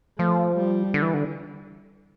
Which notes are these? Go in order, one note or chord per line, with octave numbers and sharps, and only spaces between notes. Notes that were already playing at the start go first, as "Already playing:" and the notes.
F3 A3
G3
D3
E3
D3